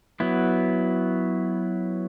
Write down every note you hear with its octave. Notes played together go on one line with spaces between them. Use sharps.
F#3 B3 E4